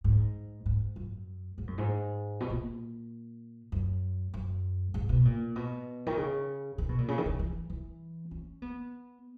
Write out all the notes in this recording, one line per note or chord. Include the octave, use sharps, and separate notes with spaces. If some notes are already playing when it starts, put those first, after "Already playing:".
G#2
G#2
F#2
G#2
F#2
G#2
B2
A#2
F#2
F#2
G#2
B2
A#2
B2
D#3
C#3
D#3
B2
A#2
C#3
D#3
C#3
E3
E3
C#4
B3